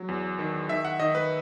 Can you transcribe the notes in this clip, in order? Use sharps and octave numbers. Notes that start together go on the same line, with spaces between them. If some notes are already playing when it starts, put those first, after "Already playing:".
Already playing: F#3
E2
D#3
D#3 E5
F#5
D#3 D#5
B4